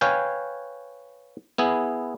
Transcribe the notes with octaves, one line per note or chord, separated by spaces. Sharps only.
B4 C#5 F5 G5 G#5
B3 E4 G#4